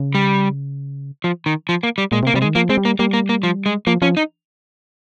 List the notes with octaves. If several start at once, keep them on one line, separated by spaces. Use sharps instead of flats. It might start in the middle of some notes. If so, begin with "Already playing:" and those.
Already playing: C#3
G3
F3
D#3
F3
A#3
G3
A#2 G#3
C3
A#3
C3 G3
G#3
D#3
F3 A#3
G#3 C4
G3
A#3
G3 A#3
A#3
A#3
F3
G#3
F3 A#3
F3 C#4
D#4